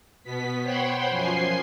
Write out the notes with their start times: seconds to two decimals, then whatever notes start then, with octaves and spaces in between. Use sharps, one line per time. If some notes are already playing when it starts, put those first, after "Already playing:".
0.23 B2 B3 B6
0.63 C5 C#5 F#5 G5 B5 C6
1.09 F#2 F3 G#5 C6 C7